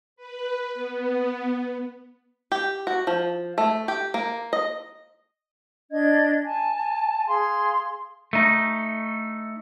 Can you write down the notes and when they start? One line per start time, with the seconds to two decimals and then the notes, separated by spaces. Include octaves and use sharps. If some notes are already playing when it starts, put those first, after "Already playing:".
0.16 B4
0.74 B3
2.52 G4
2.87 F#4
3.07 F3
3.58 A3
3.88 G4
4.14 A#3
4.53 D#5
5.91 D4 D#5 G#6
6.44 G#5 A5
7.27 G#4 F5 C6
8.33 A3 D#4